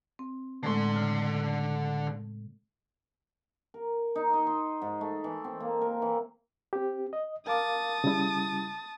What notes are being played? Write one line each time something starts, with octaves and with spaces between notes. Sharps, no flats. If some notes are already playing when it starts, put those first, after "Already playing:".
C4
A2 D3 G#3 A3 C6
C#3
A#4
D#4
D#5
C6
G#2
A3
E3
C4
A#3
A#4
E3
C4 G4
D#5
A#4 F5 A5 D6 D#6
C#3 G3 E4